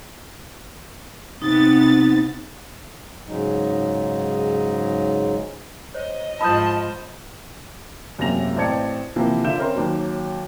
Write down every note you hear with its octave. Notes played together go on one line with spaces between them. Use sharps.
C3 B3 D#4 A6
G#2 C#3 F#3 G#3 D#4
C5 C#5 D#5
G#2 F3 A5 B5 D#6 G6
E1 F#2 C3 A#3 A#6 F7
A1 C4 D5 A5 G#6 C#7
C3 E3 F3 A#3
D3 F4 E5 G6 E7
C4 C#4 A#4 C5 C6
D#2 F#3